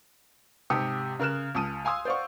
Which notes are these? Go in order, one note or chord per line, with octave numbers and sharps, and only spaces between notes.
G#2 C3 G4 A5 D#6 C#7
C#3 A#4 F6 F#6 E7
C#2 A5 D#6 D#7
F5 G#5 C6 D#6 E6
C5 D5 F5 F#5 C#6